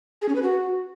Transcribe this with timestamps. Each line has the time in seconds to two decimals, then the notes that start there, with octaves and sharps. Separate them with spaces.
0.22 G#4
0.29 C#4
0.36 B4
0.43 F#4